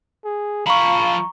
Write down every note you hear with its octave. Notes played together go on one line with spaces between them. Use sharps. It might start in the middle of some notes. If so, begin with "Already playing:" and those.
G#4
F3 F5 A#5 B5 C#6